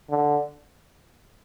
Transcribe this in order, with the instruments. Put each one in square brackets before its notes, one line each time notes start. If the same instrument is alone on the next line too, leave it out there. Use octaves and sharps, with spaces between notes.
[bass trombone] D3